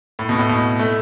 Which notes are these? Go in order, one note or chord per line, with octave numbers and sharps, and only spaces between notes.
A2
B2
A2
B2
A3